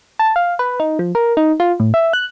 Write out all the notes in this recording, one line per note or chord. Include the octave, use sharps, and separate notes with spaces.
A5
F5
B4
D#4
F3
A#4
D#4
F4
A2
E5
F#6